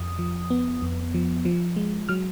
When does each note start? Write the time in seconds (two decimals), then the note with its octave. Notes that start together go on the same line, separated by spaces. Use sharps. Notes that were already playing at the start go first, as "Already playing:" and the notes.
Already playing: F2 D#6
0.19 F3
0.50 B3
0.82 F2
1.14 F3
1.45 F3
1.76 G#3
2.09 F#3 F6